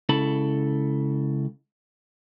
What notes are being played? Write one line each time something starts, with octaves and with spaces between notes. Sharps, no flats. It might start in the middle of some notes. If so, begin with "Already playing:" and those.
C#2 C#3 E4 A4 A5 B5